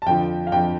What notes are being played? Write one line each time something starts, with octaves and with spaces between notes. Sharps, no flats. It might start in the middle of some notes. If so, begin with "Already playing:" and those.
A5
F2 D3 F3 G5
F5
F2 D3 F3 G5